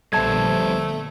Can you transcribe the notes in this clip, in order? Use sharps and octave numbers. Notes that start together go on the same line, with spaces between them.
A#1 D3 G3 A3 B3 C5 A5 G#6